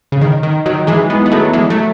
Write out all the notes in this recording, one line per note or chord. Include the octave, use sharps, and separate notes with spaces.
C#3
D#3
D#3
D#3 F#3
E3 G#3
G#3 B3
B3
F#3 A3
E3 G#3
F#3 A3